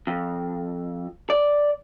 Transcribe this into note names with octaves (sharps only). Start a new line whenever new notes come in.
F2
D5